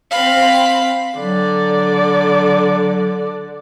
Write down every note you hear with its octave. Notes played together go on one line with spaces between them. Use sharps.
C4 F5 B5
D3 F#3 D5